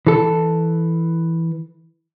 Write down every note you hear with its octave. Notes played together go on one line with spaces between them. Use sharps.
E3 A4